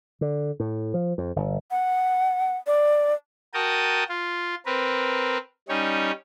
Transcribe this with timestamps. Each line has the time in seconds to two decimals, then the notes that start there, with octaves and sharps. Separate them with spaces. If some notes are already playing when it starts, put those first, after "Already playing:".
0.21 D3
0.60 A2
0.94 F3
1.18 F2
1.36 G1
1.71 F#5
2.67 D5
3.54 F#4 A#4 G5 A5 D#6
4.09 F4
4.66 C4 A#4 B4
5.69 G3 C#4 D#4 C#5